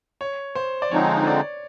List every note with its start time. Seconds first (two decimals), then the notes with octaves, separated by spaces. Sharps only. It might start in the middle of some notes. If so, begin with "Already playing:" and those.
0.21 C#5
0.55 C5
0.82 D5
0.91 D3 F3 G#3 C4 D#4 C#5
1.27 D5